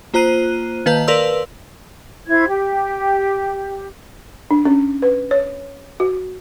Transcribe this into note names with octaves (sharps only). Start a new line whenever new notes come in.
A#3 F4 C5 A#5 F#6 D#7
D#3 A#3 B4 F5 A5 G6
A#4 B4 D5 F5 C6 E6
E4 C5 G#6
G4
D4
C#4
B4
C#5
F#4